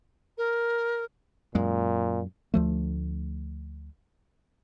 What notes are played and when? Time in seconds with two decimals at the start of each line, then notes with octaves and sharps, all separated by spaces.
0.37 A#4
1.55 F#2 A#2 G#3
2.54 D2 F3 A3